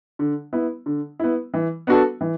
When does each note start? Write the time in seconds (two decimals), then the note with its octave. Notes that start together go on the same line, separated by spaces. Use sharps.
0.19 D3
0.53 B3 E4
0.86 D3
1.19 B3 E4
1.54 E3
1.87 B3 D4 F#4 A4
2.21 E3